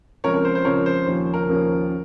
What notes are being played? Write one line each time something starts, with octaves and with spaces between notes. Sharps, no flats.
C#2 C#3 F3 C4 A#4 C#5
A#4
C5
C5
C#2 C#3 F3 C4 A#4 C#5
C5
D#2 C#3 F3 A#3 C#4
A#4
D#2 C#3 F3 A#3 C#4